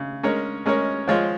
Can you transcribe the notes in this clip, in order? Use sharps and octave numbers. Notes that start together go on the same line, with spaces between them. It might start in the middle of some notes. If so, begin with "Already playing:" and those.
Already playing: C#3
G#3 C#4 A#4 C#5
G#3 C#4 A#4 C#5
F3 G#3 F4 C#5